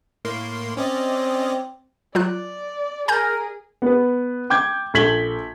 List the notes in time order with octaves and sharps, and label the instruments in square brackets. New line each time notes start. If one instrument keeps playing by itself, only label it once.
[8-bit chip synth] A2 A#3 C6
[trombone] C4 [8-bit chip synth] C#4 D5 D#5
[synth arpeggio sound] F#3 F4 F#6 [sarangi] D5
[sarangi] G#4 [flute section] A#4 [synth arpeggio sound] G#5 A#5 G6
[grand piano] B3 B4
G5 D6 G6 G#6
A#1 A4 G#6 B6 F#7 G7